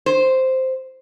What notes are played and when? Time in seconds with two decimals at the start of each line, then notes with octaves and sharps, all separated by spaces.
0.06 C5